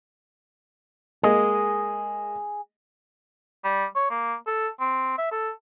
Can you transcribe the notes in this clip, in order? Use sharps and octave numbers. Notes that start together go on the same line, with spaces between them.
G#3 A#3 G#4 D#5
G3
C#5
A#3
A4
C4
E5
A4